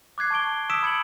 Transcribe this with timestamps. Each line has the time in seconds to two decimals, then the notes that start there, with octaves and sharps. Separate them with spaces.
0.18 D6 F#6 G#6 C7
0.31 A5 C#6 G#6 D7 G7
0.70 D#6 E6 B6 D7 E7
0.83 B5 G#6 C#7 D7 F#7